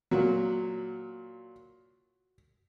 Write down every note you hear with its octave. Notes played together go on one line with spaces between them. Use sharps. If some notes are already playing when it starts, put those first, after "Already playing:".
A#2 F#3 F#4